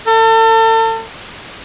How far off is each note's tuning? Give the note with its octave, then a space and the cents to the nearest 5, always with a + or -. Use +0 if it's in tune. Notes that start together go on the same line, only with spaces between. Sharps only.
A4 +35